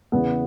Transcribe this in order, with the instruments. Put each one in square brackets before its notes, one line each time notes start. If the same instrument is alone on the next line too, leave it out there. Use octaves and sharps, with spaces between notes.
[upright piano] E2 C#3 E3 B3